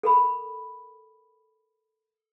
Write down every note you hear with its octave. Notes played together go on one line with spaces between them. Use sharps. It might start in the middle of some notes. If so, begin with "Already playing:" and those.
A4 A#4 B5